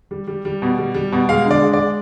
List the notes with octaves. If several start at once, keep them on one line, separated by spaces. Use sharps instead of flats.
G3
G3
G3
B2
G3
G3
B2
G#3 F5
D3
D5
G#3
D5
G#3